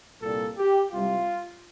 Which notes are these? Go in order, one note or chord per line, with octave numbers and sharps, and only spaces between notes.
C2 A#2 G3 A4
G4
C2 C3 G3 F4